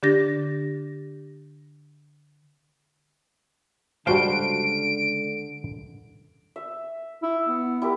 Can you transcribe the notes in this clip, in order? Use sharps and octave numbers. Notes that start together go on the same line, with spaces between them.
D3 D4 G4 A6 A#6
C#2 D3 G3 F#4 C5 F5 A5 D7
E5
E4
B3
E4 G4 A#4